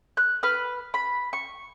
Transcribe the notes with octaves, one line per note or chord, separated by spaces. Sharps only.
F#6
B4 F6
B5
C#6